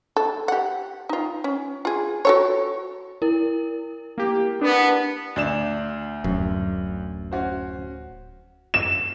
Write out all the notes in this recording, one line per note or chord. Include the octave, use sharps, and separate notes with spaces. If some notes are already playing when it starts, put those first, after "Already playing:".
A4
G4 F#5
D#4 F4
C#4
F4 G#4
F#4 A4 C#5
E4 A#4
A#3 G4
B3 D4
D2 D5 E7
D1 F#2
C#4 F#4 C5
E7